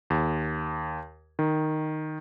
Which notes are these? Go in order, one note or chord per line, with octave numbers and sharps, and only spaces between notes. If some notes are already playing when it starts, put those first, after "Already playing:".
D#2
D#3